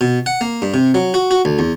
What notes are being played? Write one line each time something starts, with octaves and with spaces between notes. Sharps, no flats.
B2
F#5
A#3
G2
C3
F#3
F#4
F#4
D2
E2